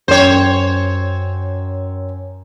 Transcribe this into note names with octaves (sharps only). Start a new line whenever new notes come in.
F#2 C5 C#5 G5